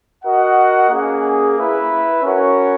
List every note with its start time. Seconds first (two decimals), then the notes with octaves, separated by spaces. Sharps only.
0.24 F#4 A#4 D#5 F#5
0.90 A#3 C#4 G#4
1.57 E4 B4 E5
2.23 C#4 F#4 A#4 C#5 F#5